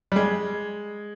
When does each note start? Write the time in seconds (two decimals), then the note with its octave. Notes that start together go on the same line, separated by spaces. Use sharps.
0.12 G3
0.16 G#3